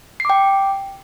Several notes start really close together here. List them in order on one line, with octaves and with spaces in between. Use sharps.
C7 D6 G5